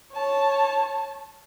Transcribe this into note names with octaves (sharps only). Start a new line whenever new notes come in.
C#5 A5